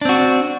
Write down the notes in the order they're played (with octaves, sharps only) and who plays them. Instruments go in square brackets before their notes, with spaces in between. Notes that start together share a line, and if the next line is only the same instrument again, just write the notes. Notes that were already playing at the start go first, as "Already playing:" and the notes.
[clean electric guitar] D4
C4
F#4